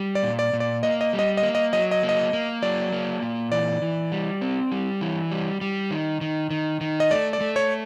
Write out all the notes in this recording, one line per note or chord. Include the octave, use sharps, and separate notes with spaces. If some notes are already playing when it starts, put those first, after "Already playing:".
Already playing: G3
D5
A#2
D5
A#2
D5
A#3 D#5
D#5
G3
D#5
D#5
A#3
D#5
F#3 D#5
D#5
A#3
D#5
A#3
F#3 D5
A#3
A#2
E3 D5
E3
G3
C4
G3
E3
G3
G3
D#3
D#3
D#3
D#3
D#5
A3 D5
D5
A3
C#5